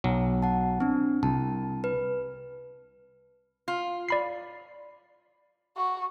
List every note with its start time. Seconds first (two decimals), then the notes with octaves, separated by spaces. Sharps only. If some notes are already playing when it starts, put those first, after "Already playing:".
0.04 B1 F#3
0.43 F#5 A5
0.80 C4 D4
1.23 C2 A5
1.84 B4
3.68 F4
4.09 D5 B5 C7
5.76 F#4